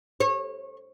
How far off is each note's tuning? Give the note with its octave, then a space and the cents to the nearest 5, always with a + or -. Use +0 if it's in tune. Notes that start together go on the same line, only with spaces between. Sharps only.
C#5 -25